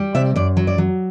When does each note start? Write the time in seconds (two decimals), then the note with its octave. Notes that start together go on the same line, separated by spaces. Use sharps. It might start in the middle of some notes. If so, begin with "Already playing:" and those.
Already playing: G3
0.15 C3 E5
0.36 F#2 D5
0.57 F#3
0.67 D5
0.78 F#3